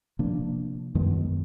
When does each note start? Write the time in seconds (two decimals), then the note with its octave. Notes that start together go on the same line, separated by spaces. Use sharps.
0.19 C3 F3 A#3 D4
0.95 F#2 D#3 G#3 B3